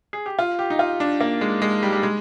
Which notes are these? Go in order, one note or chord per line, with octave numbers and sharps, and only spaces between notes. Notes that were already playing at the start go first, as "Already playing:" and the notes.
G#4
G4
F4
G4
D#4
F4
D4
A#3
G#3
G#3
G3
G3
G#3